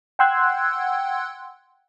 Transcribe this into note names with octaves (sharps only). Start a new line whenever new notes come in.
F#5 G5 C6 E6 F#6 G#6